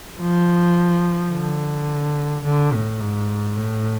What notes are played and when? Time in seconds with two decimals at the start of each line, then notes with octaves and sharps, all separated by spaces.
0.19 F3
1.31 D3
2.44 D3
2.73 A2
3.00 G#2
3.56 A2